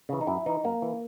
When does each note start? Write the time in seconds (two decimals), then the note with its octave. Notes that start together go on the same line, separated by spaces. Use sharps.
0.09 C#3 E3
0.21 D#4
0.27 F#2 E4
0.46 E3 D#4
0.64 F#2 A#3
0.82 E3